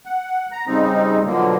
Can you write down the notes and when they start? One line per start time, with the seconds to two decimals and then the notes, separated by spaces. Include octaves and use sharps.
0.06 F#5
0.52 A#5
0.67 C#3 G3 C4 D#4
1.26 B2 D3 F3 F#3 A#3